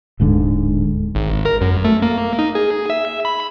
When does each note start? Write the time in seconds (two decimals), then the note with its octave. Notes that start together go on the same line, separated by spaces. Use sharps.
0.20 D1 G#2 D3
1.15 G#1
1.45 A#4
1.61 F#2
1.85 A3
2.02 A#3
2.39 D#4
2.55 G#4
2.90 E5
3.25 B5